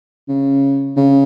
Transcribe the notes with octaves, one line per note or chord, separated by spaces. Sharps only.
C#3
C#3